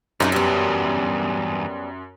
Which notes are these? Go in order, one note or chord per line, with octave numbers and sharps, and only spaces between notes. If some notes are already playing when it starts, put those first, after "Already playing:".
F#2 D3 F#3 D#4 F#4 G#4
E2 G2 G3 B3